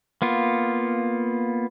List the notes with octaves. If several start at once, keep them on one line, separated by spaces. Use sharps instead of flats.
A#3 B3 F4